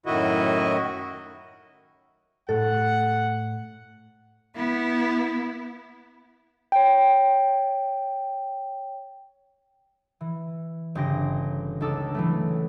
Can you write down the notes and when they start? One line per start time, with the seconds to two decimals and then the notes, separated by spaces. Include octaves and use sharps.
0.06 F#2 A2 D#3 E4 F#4 D#5
2.49 A2 A4 F#5
4.55 B3 E4
6.72 C#5 G5
10.21 E3
10.95 G1 C#3 C4 G4 A#6 D7
11.81 C#2 D#4 A4 D6 E6
12.14 E3 F#3 A3